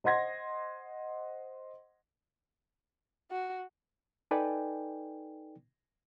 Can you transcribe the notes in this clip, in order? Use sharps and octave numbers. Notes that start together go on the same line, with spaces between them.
C5 D#5 F#5 C6 G#6 A#6
F#4
D#4 A4 B4 D5 G5 G#5